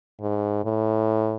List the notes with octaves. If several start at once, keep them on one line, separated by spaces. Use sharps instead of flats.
G#2
A2